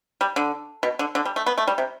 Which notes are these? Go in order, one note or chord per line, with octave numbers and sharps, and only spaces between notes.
G3
D3
B2
D3
D3
G3
A3
B3
A3
G3
C3